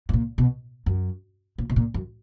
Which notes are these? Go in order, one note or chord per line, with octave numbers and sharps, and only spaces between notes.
G#2
A#2
B2
F#2
A#2
B2
A#2
F#2